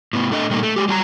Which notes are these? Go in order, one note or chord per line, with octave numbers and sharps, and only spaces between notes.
A2 B3
A3 D4 D#5
A#2 G3 A3 A#3 D#4
A3
G#3 G4
F#3 G3 G#5 A#5